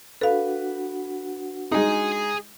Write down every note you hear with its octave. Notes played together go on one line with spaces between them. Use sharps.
D4 F#4 A4 B4 F5 F#5
G#3 D#4 G#4 G#5